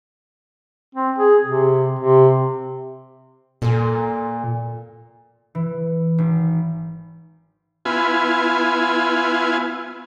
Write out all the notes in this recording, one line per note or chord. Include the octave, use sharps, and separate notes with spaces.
C4
G#4
C3
C3
A#2 A4 G#5
E3
G#1
B3 E4 F4 G#5